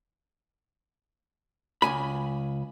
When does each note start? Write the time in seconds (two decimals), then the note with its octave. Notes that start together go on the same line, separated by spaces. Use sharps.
1.82 C#2 G#5 B5